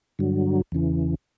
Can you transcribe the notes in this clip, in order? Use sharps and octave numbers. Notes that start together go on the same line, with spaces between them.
G2 D3 F#3
E2 C#3 E3